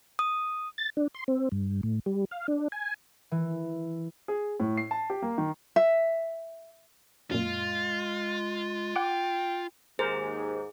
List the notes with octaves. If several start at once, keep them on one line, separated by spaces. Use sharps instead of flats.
D#6
A6
D4
C6
C4
G2
A2
G3
F5
D4
G#5
E3
G#4
A2
C7
A5
G4
A#3
D#3
E5
F#2 A#2 G#3 F4
F#5 G5 D6
D#2 G#2 G#4 A#4 C5